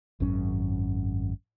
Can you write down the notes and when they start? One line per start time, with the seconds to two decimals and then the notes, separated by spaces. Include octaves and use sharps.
0.20 G#1 F#2 C#4